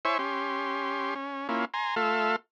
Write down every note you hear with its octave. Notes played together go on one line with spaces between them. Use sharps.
E4 C5 C#5 E5 G#5 C#6
C#4 G4 C6
C#4
A#3 C#4 E4 F4
G#5 A#5 C6
A3 F4 A4 E5 F5